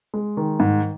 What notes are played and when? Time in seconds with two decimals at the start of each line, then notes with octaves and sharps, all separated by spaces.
0.14 G#3
0.37 D#3
0.60 G#2